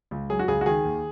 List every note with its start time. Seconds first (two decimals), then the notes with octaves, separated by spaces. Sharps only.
0.11 C#2
0.30 F#3 G#4
0.39 F#4
0.48 C#2 G#4
0.61 F#4
0.66 D#3 G#4
0.84 D#2